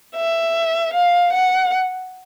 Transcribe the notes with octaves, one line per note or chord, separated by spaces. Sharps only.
E5
F5
F#5